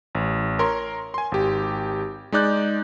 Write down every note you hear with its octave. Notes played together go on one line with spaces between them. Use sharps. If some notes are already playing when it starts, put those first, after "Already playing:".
A1
A#4 C#5 C6
G#5 C6
G#1 G4
G#3 D#4 D5 F#6 G6